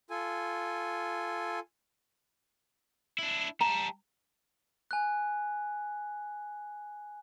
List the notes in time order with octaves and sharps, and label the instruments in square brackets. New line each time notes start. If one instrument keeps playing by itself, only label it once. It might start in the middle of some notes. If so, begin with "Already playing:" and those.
[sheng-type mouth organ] F4 A4 G#5
[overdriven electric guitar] D4 E4
[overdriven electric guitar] G3 A5 [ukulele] A#5
[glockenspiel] G#5 F#6